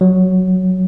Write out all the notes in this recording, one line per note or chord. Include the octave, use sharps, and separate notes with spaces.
F#3